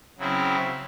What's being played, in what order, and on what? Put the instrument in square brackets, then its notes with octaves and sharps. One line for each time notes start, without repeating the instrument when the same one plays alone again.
[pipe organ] C#3 F#3 C4 E4